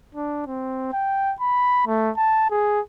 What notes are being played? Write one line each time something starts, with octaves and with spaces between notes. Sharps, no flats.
D4
C4
G5
B5
A3
A5
G#4